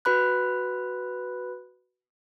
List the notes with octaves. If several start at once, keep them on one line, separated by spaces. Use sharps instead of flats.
F#4 B4 B5 F#6